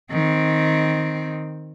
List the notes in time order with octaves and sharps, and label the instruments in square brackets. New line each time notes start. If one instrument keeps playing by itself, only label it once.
[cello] D#3 C4